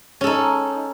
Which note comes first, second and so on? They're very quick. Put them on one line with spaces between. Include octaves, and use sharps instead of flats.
C#4 A4 D#4